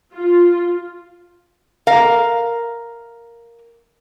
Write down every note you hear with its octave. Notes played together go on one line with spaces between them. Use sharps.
F4
A#4 F5